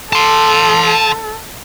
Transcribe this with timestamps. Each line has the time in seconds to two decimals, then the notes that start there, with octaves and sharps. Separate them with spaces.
0.13 A4 A5 C6